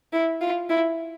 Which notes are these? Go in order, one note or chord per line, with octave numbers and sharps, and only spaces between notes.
E4
F4
E4